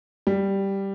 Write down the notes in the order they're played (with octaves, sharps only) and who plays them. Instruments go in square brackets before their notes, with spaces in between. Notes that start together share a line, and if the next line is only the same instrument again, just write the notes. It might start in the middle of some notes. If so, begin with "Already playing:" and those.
[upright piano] G3